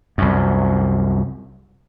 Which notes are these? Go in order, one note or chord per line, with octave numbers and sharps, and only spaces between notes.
C2 F#2